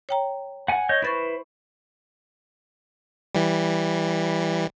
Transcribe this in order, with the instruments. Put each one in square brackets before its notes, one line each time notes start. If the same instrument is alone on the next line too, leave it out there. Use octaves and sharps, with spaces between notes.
[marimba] C#5 G5 A#5
[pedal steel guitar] F#5 G#5
C#5 D#5 G6
[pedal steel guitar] E4 B4 C5 [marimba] C#6 A6 A#6
[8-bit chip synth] E3 G3